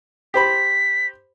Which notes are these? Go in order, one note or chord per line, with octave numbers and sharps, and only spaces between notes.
G4 C5 B5 B6